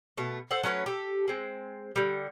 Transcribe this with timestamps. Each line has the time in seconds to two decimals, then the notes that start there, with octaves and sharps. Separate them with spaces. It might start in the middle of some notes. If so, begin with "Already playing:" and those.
0.17 B2 A3
0.51 A4 C5 F#5
0.63 F#3 A3 C#4 B4
0.86 G4 A4
1.28 G#3 C4
1.96 D3 G3